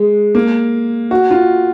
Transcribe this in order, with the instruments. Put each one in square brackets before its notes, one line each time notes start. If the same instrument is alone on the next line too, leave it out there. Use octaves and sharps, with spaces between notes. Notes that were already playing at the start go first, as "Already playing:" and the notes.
Already playing: [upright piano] G#3
A#3
F#4
F4